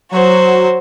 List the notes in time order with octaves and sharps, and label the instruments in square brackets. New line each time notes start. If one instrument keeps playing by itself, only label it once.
[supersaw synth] F#3 [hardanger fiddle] F#4 C5